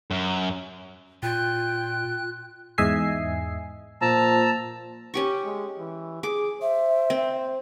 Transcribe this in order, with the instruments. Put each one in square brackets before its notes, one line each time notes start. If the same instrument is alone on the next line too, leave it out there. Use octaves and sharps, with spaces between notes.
[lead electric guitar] F#2
[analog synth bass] A#2 [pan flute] F4 [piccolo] G5 [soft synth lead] F#6
[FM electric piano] E2 G#2 D#5 E5 G#5 C7
[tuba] A#2 [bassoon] F3 [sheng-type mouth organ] A5 A#5 E6
[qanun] C#4 G4 C#6
[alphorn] G#3
E3
[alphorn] G#4 [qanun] D6
[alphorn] C5 [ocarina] E5
[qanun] C4